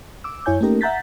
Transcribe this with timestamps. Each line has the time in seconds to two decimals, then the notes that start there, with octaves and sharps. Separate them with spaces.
0.24 D6 E6
0.46 F#2 E4 C#5 G#5 G6
0.61 A3 A#3 C#4 D#4 G4 A#4
0.81 E5 F#5 A#5 G6 A6 B6